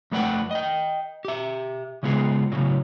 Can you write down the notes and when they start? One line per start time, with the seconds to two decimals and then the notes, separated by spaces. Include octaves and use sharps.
0.12 F2 A3 B4 D5 F#5 G5
0.51 D#5 G5
1.25 G4 E5
2.03 C#3 G#3 B3 F4 G#4
2.52 A2 C#3 F#3